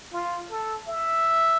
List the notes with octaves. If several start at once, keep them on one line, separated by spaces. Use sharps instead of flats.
F4
A4
E5